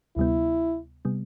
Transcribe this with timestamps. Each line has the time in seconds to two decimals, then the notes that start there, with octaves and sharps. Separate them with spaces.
0.16 D2 C3 G3 B3 E4
1.05 C3 G3 B3